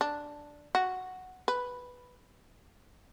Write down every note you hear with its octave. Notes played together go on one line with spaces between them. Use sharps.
D4
F#4
B4